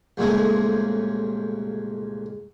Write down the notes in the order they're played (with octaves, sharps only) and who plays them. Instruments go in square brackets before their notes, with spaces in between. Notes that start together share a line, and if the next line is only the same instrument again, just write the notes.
[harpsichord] C2 F2 A#2 C#3 G#3 A3